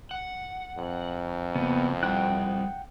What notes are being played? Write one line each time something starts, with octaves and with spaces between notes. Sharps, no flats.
F#5
F2
C#3 A#3 B3
G3 E4 F#5 G5 F#6